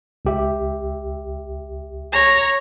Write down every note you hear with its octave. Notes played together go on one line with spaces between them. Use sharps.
C#2 G4 E5
C#5 A#5